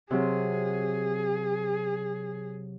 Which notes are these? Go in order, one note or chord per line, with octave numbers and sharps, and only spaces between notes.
C3 F#3 G#4